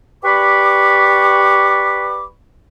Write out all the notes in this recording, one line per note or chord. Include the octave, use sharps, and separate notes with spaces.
G4 B4 D5 B5 C#6 D6